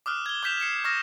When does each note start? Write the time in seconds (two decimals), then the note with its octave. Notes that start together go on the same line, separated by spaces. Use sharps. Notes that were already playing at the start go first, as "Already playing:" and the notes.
0.06 D6 D#6 F6 F#6
0.26 G#6 G7
0.43 D6 F#6 G6 B6 E7 F7
0.60 C7 C#7 E7
0.84 C#6 D#6 F6 A#6 E7